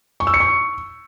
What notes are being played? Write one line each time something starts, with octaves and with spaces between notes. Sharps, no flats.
C#6
E6
C#7
C#6